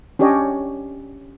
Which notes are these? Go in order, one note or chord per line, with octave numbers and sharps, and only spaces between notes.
C#4 D4 G4 C#5 D#5